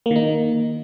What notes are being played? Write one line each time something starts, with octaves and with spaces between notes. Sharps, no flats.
D#3 A#3 D#4